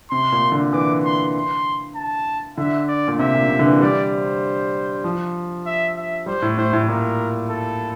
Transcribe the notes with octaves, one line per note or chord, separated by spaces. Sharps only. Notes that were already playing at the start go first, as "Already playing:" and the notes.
C3 C6
A#2
D3
E3 D6
C6
C6
A5
D3 E5
D5
A#2
C3 E5
A#2
C3
D3
E3
G3 D5
C5
F3
E5
E5
G3 C5
A2
A2 C5
A2
A2
A#2 A#4
A4